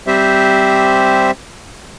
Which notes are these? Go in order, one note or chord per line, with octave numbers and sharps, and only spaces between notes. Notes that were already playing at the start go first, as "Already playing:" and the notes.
G3 C4 G4 C5 E5